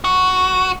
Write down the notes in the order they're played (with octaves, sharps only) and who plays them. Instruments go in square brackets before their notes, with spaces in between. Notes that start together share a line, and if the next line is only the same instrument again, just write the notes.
[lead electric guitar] F#4